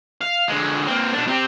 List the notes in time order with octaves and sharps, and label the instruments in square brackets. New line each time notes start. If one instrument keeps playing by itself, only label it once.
[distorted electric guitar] F5
D3 G#3
A#3 C4
B2 D4
C4 G4